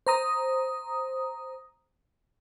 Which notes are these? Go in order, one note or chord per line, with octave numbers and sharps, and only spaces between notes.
C5 A#5 D#6